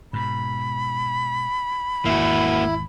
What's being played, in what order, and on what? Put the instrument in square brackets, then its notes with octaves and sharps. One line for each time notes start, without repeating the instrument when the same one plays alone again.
[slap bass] G#2 B2 [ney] B5
[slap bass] G#1 E2 [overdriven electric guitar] A#3 F#4 [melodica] E4